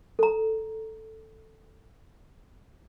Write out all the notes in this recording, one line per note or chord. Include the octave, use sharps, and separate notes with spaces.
A4 A#5